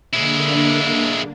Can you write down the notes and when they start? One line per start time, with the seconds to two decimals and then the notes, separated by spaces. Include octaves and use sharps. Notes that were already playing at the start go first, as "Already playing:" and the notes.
0.13 D3 G#3 A#3 D4 E4